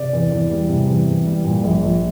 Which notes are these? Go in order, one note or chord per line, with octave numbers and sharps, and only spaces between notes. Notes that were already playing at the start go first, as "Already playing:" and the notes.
Already playing: C3 D5
E2
E2
G3
C3
E2
E2
G3
A#2
A#1
A#1